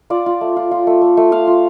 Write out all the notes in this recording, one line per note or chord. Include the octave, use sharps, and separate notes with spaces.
F4 D5
F4
A3
F4
F4
A3
A3
A3
F4 F5
F4